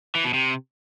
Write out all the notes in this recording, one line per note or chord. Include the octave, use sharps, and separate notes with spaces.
E3
B2
C3